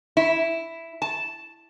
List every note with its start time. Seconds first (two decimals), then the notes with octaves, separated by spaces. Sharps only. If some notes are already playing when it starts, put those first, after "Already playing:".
0.17 E4
1.02 A5